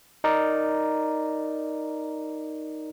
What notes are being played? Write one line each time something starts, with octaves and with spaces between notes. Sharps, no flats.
D#4 A#4 D5